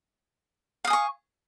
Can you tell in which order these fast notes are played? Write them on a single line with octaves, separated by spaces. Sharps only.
F5 D#6 G#5 C#6